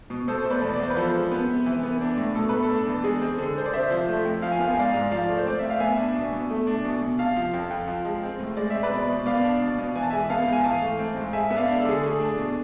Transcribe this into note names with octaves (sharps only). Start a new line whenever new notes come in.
B2
B2 A4 C5
A3 C5
B4 D5
E2
D5
E2 C5
B4
F3 A4 C5
G#3
B3
C3
E3
B3
D4
A2
B2 A4
A3 B4
A4
D4
E2
G#3 G#4
C4
D3
D3 C5
D5
C3 C5 E5
F3
A3
F2
F3 F5
G#5
B3 F5
G#5
G#2 D5 F5
G#2
F3 D5 F5
A3
C5
C4 D5
A2 E5
F5
B3 E5 G#5
D4
B2
B2
A3
D4
B2
B2
C3 F5 A5
F3
F2
F2
F3
G#3
C4
A2
G#3 D5
C4 E5
B4 D5
B2
B2
B3 D5 F5
D4
B2
B2
E3 G#5
A5
G#3 E5 G#5
B3 F5 A5
G#2
G#5
E3 F5 A5
A3
C4
G#2
G#3 E5 G#5
B3 E5
D5 F5
D4
A4
D3 G#4
A3 G#4
D4
B2